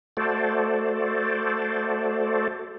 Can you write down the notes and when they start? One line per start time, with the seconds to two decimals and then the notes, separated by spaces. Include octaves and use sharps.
0.17 A3 F#4 A4 C5 D5